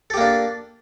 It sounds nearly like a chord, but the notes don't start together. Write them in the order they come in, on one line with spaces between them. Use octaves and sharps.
A4 G4 A#3 D4